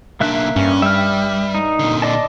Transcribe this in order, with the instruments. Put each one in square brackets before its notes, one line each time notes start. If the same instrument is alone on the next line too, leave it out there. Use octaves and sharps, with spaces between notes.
[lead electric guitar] B1 D4 [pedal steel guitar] A#3 E5 F#6
[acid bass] G2 [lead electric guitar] C#4
[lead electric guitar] G3 [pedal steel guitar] E5 F6
[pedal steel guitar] D#4
[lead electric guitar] A#2 D3
[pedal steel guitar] D5 D#5 A5